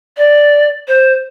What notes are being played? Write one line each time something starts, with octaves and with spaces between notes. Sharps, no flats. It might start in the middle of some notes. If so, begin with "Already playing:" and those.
D5
C5